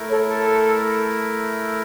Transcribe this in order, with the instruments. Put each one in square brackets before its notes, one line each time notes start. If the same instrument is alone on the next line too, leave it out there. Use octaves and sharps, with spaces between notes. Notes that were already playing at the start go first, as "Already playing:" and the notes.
Already playing: [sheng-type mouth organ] A3 E4 A#4
[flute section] A4 C#5
A4